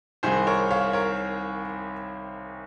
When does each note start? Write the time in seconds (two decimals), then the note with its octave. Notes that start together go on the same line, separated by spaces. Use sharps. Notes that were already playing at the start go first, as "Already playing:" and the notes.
0.23 C2 C3 D#3 G#4 C5
0.47 A#4 C#5
0.71 C#5 F5
0.93 A#4 C#5